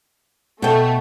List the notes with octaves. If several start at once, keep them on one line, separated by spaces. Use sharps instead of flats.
B2 A3 G5